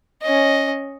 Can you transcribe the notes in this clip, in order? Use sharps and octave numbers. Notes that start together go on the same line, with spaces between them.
C#4 D#5